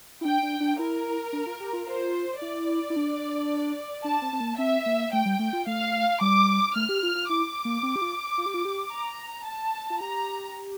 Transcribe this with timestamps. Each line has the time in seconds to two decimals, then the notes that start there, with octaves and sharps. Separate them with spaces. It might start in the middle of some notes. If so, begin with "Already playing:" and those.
0.21 E4
0.24 D4 G5
0.43 D4
0.60 D4
0.79 E4 A#4
1.33 D4
1.46 F4
1.60 G4
1.73 F4
1.87 F4 C5
2.41 E4 D5
2.90 E4
2.96 D4
4.04 D4 A5
4.22 C4
4.33 C4
4.40 A#3
4.58 C4 E5
4.86 A#3
5.13 A3 G5
5.25 G3
5.39 A3
5.53 F4
5.67 A3 F5
6.21 G3 D6
6.75 A3 F6
6.89 G4
7.03 F4
7.15 F4
7.29 E4 D6
7.65 A#3
7.83 C4
7.96 G4
8.02 F4
8.38 F4
8.46 G4
8.54 F4
8.65 G4
8.92 A#5
9.46 A5
9.90 F4
10.01 G4 A#5